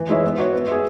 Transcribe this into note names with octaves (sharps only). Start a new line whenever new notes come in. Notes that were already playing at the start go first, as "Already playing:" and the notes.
Already playing: E3
G#3 E4 C#5 E5
B3
F#4 C#5
B3
G#4 E5